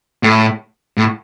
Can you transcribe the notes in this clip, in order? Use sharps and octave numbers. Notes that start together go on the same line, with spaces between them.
A2
A2